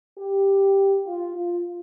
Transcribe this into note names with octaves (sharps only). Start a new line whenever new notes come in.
G4
F4
F4